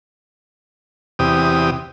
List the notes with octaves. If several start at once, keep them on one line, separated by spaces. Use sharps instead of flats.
E2 C3 G4 D#6